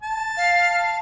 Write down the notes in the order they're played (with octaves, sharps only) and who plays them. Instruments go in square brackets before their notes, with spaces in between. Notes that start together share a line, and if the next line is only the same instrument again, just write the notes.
[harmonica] A5
[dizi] F5